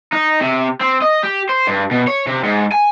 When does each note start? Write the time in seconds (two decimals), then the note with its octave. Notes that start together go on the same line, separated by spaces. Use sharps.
0.13 D#4
0.41 C3
0.81 C4
1.02 D#5
1.23 G4
1.49 C5
1.67 G2
1.91 B2
2.08 C#5
2.27 C3
2.44 G#2
2.72 G#5